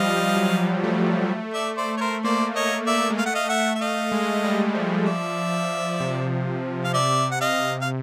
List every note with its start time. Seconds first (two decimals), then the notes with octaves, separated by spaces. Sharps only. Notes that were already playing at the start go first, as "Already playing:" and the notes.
Already playing: F3 G3 D#5 F5
0.37 F#3
0.84 A3
1.53 D5 E5
1.77 C5 D5
1.97 C#5
2.01 A#4 C5
2.24 A#3 C5 D5
2.55 C#5 D#5
2.86 D5 E5
3.10 G#3
3.18 A3 F5
3.26 F#5
3.34 D#5 F5
3.49 E5 F#5
3.75 E5
3.81 D#5 F5
4.12 G#3
4.44 G3
4.75 F3
5.06 D5 E5
6.00 C3
6.84 F5
6.94 C3 D5 E5
7.31 F#5
7.41 D#5 F5
7.82 F5